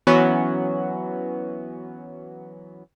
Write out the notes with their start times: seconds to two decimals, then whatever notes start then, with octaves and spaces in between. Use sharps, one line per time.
0.07 E3 F#3 B3 C#4 F#4